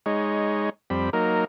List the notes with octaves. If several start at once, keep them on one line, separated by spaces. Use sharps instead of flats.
G#3 D#4 C#5
F2 G3 C4 B5
F#3 A#3 D#4 A#4